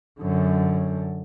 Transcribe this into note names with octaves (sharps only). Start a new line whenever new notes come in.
F#2 D3